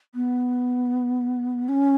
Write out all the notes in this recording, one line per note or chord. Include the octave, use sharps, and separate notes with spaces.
B3
C#4